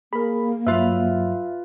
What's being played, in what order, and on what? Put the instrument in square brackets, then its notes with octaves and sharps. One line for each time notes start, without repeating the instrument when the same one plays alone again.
[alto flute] A#3 [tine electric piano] G#4 A#4 [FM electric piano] B5
[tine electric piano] G2 F#3 [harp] F4 B4 [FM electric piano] E5